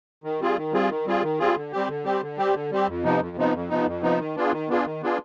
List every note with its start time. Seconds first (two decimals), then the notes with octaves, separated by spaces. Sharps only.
0.24 D#3
0.40 G3 C4 F4 G#4
0.57 D#3
0.73 G3 C4 F4 G#4
0.90 D#3
1.06 G3 C4 F4 G#4
1.23 D#3
1.39 G3 C4 F4 G#4
1.56 D3
1.72 G3 C4 G4
1.89 D3
2.05 G3 C4 G4
2.22 D3
2.38 G3 C4 G4
2.54 D3
2.71 G3 C4 G4
2.88 F2
3.04 C3 F3 B3 D#4
3.20 F2
3.37 C3 F3 B3 D#4
3.53 F2
3.69 C3 F3 B3 D#4
3.86 F2
4.03 C3 F3 B3 D#4
4.19 D#3
4.36 B3 D4 F4 G#4
4.52 D#3
4.69 B3 D4 F4 G#4
4.85 D#3
5.02 B3 D4 F4 G#4